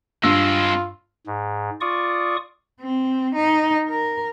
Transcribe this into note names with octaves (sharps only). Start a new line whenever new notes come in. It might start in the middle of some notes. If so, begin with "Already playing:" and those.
G2 G#3 C4 F4 E6
G#2
F4 D5 C#6 D#6
C4
D#4
A#4